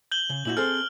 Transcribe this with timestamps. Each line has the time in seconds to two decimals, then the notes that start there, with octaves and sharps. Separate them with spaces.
0.11 G6 F#7 G7
0.30 C#3
0.45 A#2 E4 F#4 F#7
0.57 C4 G#4 A4 F6